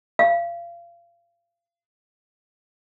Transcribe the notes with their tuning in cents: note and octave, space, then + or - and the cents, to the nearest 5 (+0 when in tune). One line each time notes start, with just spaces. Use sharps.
F5 -30